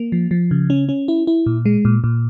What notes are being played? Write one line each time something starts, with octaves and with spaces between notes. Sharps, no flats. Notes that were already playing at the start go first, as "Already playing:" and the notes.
Already playing: A#3
F3
F3
C#3
C#4
C#4
E4
E4
A#2
G#3
A#2
A#2